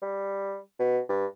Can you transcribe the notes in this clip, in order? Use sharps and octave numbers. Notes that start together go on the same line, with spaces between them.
G3
B2
G2